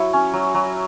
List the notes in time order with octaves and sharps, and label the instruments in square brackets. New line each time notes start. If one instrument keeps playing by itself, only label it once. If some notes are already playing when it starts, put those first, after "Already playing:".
Already playing: [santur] F#3 E4 C#6
C#4
F#3
F#3